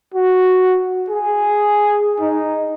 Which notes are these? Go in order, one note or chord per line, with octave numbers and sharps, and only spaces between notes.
F#4
G#4
D#4